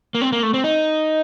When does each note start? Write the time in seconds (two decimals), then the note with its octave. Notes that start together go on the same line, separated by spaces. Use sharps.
0.15 A#3
0.22 C4
0.32 A#3
0.43 A3
0.54 C4
0.64 D#4